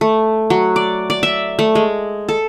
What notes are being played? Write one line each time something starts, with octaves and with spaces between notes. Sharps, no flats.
A3
F#3
D5
D5
E5
A3
G#3
A4